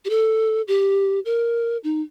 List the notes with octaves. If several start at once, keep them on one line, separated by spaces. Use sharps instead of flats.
G4
A4
G4
A#4
D#4